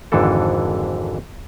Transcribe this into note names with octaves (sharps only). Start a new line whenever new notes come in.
G#1 F2 G#2 D3 E3 A4